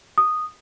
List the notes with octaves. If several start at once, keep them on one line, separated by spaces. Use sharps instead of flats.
D#6